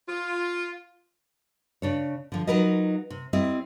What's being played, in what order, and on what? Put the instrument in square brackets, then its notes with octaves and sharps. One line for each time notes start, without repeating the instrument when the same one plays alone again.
[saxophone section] F4
[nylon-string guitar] C#3 D4 C#5
D3 F3
F#3 D#4 F4 A#4 B4 D#5
C3
G3 C4 E4 D#5